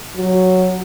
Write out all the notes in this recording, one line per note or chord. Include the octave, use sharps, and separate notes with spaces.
F#3